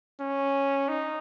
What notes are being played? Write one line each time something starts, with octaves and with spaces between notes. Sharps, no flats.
C#4
D#4